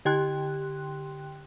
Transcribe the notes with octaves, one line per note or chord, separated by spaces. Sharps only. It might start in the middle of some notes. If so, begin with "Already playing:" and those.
D3 G4 G5 C6 F#6